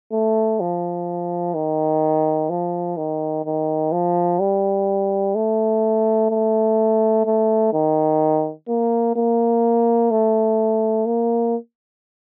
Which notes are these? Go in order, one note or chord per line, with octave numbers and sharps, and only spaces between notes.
A3
F3
D#3
F3
D#3
D#3
F3
G3
A3
A3
A3
D#3
A#3
A#3
A3
A#3